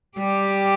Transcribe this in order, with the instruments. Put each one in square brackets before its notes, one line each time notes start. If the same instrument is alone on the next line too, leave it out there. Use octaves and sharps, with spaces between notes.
[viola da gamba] G3 G4